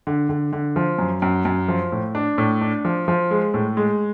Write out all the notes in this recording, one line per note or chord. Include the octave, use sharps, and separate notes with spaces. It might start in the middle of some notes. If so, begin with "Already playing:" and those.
D3
D3
D3
F3
F#2
F#2
F#2
F3
A2
D4
A2
D4
F3
F3
G#3
A2
G#3